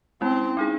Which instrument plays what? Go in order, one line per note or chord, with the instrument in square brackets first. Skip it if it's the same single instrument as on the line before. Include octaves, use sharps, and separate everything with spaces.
[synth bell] G#3 C#4 E4 [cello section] C4
[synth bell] C4 D#4 G#4